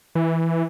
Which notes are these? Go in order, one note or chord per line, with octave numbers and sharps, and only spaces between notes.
E3